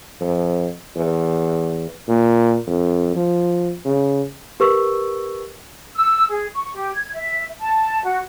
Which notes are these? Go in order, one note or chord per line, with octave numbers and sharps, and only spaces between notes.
F2
E2
A#2
F2
F3
C#3
G4 A#4 B4 C#6 E6
E6
G#4
C#6
G4
G#6
E5
A5
F#4